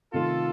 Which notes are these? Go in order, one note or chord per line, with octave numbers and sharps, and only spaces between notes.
C3 D#3 A3 D#4 F4 A4